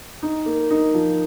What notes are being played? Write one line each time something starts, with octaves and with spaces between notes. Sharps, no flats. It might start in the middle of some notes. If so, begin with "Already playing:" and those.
D#4
A#3
D#4
F3